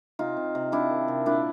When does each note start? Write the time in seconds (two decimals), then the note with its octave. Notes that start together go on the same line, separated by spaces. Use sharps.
0.19 C3 D#4 F4
0.37 C3
0.55 C3
0.72 C3 D4 E4
0.90 D#3
1.08 C3
1.26 A#2 D4 E4